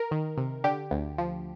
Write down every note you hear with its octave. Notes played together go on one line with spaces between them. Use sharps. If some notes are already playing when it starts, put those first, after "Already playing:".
Already playing: A#4
D#3
C3
D3 G4
D2
F3